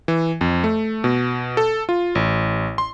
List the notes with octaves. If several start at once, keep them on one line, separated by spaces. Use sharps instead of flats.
E3
F2
A3
B2
A4
F4
A1
C6